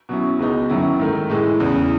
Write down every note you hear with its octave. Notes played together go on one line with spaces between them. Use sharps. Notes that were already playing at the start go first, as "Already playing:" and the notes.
B2 F#3 C#4 E4
C#2 B2 G#3 B3 D#4
F#2 D#3 F#3 C#4 E4
G#2 D#3 A3
A2 E3 G#3
E2 C#3 E3